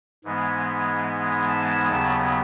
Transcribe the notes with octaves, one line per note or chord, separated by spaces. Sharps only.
G#2 E3 G#3 B3
A5
D#2 C#3 F#3 B3 A5